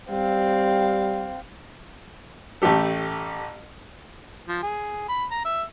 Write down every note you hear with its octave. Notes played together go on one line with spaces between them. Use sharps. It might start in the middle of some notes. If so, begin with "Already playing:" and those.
G3 C4 F5
A1 A3 G4 A4
F3
G#4
B5
A#5
E5